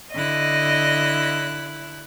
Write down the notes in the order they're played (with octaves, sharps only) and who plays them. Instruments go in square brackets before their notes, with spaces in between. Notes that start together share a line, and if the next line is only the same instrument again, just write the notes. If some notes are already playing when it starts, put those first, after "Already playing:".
[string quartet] D3 E4 F#6 [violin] D#5